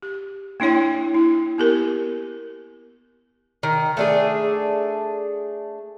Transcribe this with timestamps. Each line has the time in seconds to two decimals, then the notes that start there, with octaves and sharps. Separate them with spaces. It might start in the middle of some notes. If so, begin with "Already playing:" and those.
0.02 G4
0.60 A#3 D4 E4 C#5 G5
1.14 E4
1.58 B3 G4 A#4
3.63 D#3
3.97 A3 D4 G#4